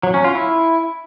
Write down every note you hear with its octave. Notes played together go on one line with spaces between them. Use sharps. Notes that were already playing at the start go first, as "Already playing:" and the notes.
F#3
C#4
F4
E4